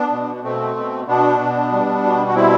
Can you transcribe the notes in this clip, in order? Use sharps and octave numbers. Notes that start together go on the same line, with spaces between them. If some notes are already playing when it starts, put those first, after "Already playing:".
Already playing: B3 D4
B2
B2 A3 C4
B2
B2 B3 D4
B2
G3
B2
F#4
G3 C4 E4